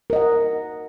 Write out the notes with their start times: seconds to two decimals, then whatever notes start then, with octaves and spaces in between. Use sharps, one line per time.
0.10 A#4
0.13 D#5
0.16 F#5